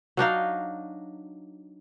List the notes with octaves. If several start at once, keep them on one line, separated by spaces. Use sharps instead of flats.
F#3 D4 D#4 F5